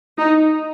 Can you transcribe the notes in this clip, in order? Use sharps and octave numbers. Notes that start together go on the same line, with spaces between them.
D#4